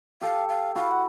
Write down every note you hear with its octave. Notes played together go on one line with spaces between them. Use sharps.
G4 A4 F5
F5
E4 F#4 F5
F#5